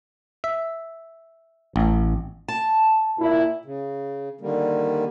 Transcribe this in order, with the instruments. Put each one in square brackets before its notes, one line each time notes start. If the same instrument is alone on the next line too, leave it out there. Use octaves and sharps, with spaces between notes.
[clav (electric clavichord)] E5
A1
[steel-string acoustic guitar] A5
[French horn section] A#2 E4
[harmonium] C#3
D3 D#3 G3 A#3